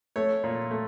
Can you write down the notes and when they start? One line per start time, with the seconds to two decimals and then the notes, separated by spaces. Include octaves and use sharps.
0.16 A3 C#5
0.44 A#2
0.71 A3